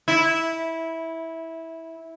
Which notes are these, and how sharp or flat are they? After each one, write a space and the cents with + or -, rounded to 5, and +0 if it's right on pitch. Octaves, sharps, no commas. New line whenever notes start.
E4 -15